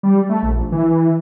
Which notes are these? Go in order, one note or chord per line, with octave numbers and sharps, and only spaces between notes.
G3
A3
A#1
E3